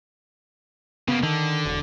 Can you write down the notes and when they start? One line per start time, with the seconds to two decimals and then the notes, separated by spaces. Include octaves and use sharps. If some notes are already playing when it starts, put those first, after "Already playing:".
1.08 C#3 A#3 B3
1.23 D3 D#3
1.65 E1